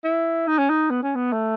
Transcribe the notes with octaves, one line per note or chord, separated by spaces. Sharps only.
E4
D#4
C#4
D#4
B3
C#4
B3
A3